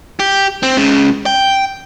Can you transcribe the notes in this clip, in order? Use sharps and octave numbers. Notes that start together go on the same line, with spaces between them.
G4
C4
C#2 C#3
G5